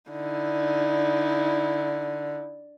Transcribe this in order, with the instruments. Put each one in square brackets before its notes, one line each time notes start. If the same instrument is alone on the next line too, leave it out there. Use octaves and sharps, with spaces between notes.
[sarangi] D3 [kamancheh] D#4 E4